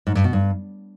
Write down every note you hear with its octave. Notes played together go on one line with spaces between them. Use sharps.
G#2
G2
B2
G2